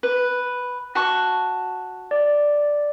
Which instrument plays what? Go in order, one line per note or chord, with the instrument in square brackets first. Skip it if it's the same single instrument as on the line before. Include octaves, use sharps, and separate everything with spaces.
[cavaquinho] B4
F#4 A5 C#6
[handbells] D5